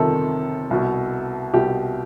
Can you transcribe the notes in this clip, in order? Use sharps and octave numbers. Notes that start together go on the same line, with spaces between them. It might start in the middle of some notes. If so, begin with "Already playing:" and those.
Already playing: G1 F2 C3 D#3 A4
C2 B2
C2 B2 G4